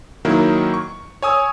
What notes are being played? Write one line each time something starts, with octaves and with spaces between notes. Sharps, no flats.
D#3 F#3 A#3 E4
C#6
C#5 G#5 D#6 E6